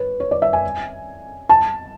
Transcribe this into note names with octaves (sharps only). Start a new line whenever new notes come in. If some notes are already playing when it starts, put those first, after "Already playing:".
Already playing: B4 C#5
C#5
D5
E5
G#5
A5